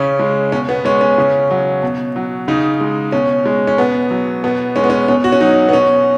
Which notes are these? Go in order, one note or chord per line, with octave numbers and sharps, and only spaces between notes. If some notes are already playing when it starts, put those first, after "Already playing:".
Already playing: C#3 C#4
G#3
B2 C#4
B3
G#3 C#4
C#4
C#3
F#3
B2
F#3
C#3 D#4
G#3
B2 C#4
G#3
C#4
B2 B3
F#3
B2 B3
G#3 C#4
B3
C#4
B2 C#4
F#4
C#4
F#3 D#4
B3
B2 C#4